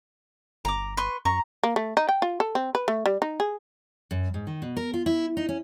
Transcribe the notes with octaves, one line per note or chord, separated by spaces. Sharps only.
G1 A#5 D6
B4 C6 C#6
F#2 A#5 C#6
A#3
A3
D#4
G5
F4
A4
C4
B4
A3
G3
D#4
G#4
F#2
G#2
D#3
B2
A#4
F4
E4
D#4
C#4